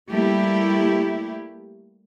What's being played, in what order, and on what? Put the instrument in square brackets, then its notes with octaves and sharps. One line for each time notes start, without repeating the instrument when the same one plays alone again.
[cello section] G3 A3 A#3 E4 G4